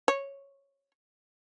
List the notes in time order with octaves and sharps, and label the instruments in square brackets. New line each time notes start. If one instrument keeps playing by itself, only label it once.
[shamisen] C#5